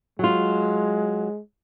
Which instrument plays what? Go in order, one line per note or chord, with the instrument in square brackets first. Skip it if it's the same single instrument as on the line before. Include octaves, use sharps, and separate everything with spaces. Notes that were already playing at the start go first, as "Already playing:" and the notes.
[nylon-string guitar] F#3 F4 [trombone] G#3